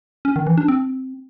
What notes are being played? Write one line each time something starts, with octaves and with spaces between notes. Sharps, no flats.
C#4
D#3
E3
D4
C4